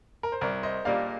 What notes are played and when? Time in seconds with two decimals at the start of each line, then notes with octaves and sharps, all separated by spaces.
0.23 A#4
0.32 C5
0.41 C2 A#4 D5
0.63 C5 D#5
0.85 A#2 G3 A#3 D4 D5 F5